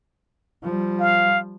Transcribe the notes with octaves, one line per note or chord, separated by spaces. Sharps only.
F3 G3
F5